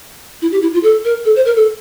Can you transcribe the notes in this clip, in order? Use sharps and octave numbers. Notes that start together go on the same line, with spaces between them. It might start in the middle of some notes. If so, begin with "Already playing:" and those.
E4
G4
E4
F4
A4
A#4
A4
C5
A#4
A4